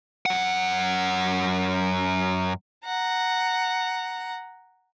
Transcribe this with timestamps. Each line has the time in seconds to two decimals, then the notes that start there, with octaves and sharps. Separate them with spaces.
0.26 F#2 F#5
2.85 F#5 A#5